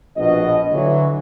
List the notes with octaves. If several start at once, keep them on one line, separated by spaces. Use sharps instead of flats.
A#1 B2 D#5
D3 E3 F#3